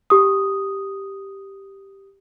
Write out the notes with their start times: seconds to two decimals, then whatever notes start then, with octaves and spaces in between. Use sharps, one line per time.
0.10 G4 D#6